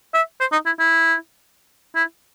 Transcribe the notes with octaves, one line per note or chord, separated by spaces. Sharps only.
E5
C5
D#4
E4
E4
E4